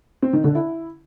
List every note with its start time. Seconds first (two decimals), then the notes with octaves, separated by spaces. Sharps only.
0.22 C4
0.33 D#3
0.44 D3
0.55 E4